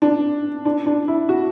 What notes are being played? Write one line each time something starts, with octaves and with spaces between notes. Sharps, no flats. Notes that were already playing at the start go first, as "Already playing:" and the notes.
D4
D4
D4
E4
F#4